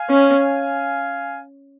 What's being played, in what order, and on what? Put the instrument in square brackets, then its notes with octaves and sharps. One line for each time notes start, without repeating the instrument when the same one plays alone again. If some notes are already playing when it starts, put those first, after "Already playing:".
Already playing: [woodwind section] F5 G#5
[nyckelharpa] C#4